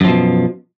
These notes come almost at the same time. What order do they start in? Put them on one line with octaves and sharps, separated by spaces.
F#2 F3 B2